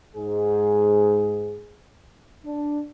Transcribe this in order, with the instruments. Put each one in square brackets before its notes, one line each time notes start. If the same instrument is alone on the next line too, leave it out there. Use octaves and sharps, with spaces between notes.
[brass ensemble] G#2 G#4
D4